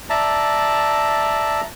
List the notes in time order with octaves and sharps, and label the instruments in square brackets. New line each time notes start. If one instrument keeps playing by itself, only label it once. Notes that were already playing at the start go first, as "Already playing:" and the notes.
[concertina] D5 E5 A5 A#5